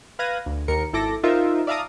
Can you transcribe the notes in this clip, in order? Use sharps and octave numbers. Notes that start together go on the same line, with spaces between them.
B4 F5 F#6 G#6 A#6 D#7
D2
D#2 A#4 C#7
G#1 E4 A4 D6 A#6
D#4 F4 A#4 C5 E5
D5 E5 F5 A5 A#5 D#6